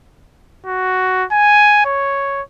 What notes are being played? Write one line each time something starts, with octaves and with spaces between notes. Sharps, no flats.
F#4
G#5
C#5